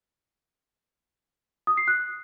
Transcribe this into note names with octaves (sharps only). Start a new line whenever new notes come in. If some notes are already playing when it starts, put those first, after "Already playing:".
D#6
C7
F#6